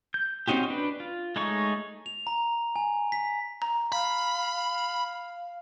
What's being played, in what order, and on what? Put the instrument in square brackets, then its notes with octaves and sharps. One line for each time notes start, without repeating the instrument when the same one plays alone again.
[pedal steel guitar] G6
C4 C#4 D#4 F#4 G4
D4 B4
F4
G#3 A3 D#4 C#5 C#6
[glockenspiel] F7
A#5
G#5
B6
[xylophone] A#5
[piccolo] F5 [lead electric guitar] B5